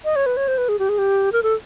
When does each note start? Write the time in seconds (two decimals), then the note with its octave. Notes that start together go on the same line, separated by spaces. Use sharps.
0.05 D#5
0.16 C#5
0.26 B4
0.37 C#5
0.48 C5
0.58 B4
0.69 G#4
0.79 G4
0.89 G#4
0.98 G4
1.33 A#4
1.43 A4